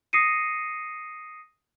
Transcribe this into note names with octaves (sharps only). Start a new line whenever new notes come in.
D#6 A#6 C7 C#7 D#7